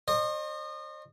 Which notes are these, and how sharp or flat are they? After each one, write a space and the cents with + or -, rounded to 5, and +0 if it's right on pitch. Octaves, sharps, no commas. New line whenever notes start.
C5 +45 D#5 -35